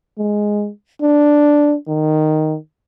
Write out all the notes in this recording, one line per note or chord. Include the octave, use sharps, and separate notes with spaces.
G#3
D4
D#3